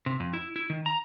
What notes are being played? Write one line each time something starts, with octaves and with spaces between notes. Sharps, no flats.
C3
F2
E4
E4
D#3
A#5